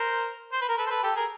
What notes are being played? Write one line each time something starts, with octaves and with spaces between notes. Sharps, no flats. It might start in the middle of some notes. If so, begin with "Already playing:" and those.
Already playing: A#4 C5
C5
B4
A#4
A4 B4
C5
A4 B4
G4 A4
G#4 A#4